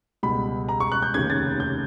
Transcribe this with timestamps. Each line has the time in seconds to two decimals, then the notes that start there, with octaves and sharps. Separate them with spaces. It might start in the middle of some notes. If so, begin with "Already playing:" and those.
0.23 C#2 B2 G3 B5
0.69 A#5
0.80 C#6
0.92 F#6
1.03 G6
1.14 F1 D#2 C#3 G#6
1.30 A6
1.60 G6